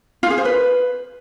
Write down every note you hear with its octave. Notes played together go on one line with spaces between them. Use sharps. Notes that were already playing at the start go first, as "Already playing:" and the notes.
F4
G#4
C5
B4